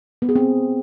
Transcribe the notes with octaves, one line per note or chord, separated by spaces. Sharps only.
B3
G#4
C4